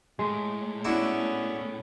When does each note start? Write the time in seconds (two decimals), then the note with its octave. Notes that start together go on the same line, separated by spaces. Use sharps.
0.19 A2 G#3
0.85 B3 C#4 D4 E4 F#4